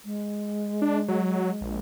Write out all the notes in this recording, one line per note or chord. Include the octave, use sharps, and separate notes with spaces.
G#3
D4
F#3
A#1